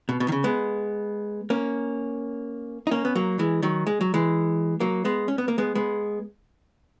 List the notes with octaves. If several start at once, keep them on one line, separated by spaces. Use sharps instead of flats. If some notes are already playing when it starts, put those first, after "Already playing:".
B2
B2
D#3
C#3
G#3 B3
A#3 C#4
D#4
A#3 C#4
B3
F#3 A#3
E3 G#3
D#3 F#3
G#3
F#3
E3 G#3
F#3 A#3
G#3 B3
C#4
B3
A#3
G#3 B3
G#3 B3